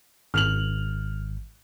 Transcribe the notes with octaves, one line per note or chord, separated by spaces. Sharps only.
G#1 F6 F7 F#7